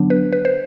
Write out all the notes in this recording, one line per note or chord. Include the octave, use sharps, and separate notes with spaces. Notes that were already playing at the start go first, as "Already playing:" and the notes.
Already playing: D3 F#3 B3 D4
B4
B4
C5